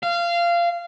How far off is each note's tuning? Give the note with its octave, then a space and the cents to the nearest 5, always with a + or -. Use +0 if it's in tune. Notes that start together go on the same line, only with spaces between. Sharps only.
F5 -20